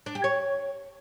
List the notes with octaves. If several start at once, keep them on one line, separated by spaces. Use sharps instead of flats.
D4
G4
C#5